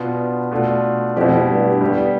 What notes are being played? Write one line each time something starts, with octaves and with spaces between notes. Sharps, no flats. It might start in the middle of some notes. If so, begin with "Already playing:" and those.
Already playing: B2 B3 D4 F4
B2 A3 D4 F4
F2 B2 A3 E4 G4
G2
G3 B3 E4 G4